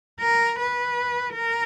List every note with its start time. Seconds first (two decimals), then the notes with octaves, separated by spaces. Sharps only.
0.20 A#4
0.59 B4
1.35 A#4